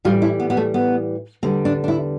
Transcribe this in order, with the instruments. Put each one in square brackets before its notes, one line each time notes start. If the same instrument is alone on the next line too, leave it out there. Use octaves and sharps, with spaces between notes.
[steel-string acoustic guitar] A2 E3 G3 F4
E4
B3
B3
A3
B3
E2 D3 G3 C4
D4
D4
E4